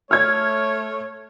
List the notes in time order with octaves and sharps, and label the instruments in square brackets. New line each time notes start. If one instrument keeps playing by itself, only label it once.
[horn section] A3 C#5 [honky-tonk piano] F6 G#6